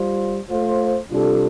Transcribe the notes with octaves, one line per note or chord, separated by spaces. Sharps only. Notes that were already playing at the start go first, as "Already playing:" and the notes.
Already playing: G3 F4 C5
A3 F4 C5
C3 G3 D4 F4 A4